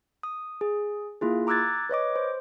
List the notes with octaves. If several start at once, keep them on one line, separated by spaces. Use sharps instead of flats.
D#6
G#4
A#3 E4 F4 G#4
A#5 D6 E6 F#6 G#6 A6
B4 C#5 D#5 D6
C5